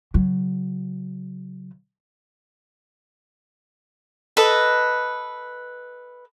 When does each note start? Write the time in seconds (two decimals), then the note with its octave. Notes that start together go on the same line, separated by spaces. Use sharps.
0.14 C#3 F#3
4.37 A4 B4 D#5